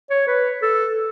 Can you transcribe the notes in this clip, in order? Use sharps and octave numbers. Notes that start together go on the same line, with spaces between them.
C#5
B4
A4